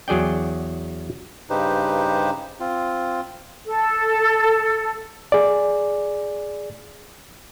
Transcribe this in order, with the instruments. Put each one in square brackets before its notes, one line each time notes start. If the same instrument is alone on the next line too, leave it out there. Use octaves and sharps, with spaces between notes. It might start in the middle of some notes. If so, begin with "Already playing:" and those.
[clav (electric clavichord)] E2 F#3 G#4 D5 G5
[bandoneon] G2 C#3 D#4 G4 B4 C5
C4 F4
[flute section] A4
[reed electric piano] G#4 D5